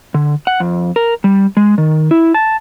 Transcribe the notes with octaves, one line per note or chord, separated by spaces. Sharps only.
D3
F#5
F2
A#4
G3
G#3
D#3
E4
A5